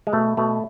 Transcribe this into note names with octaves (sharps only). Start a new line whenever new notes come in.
G#3
B2 A3
B2 A3